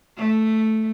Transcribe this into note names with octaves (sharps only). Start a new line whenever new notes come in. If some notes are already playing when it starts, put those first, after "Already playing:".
A3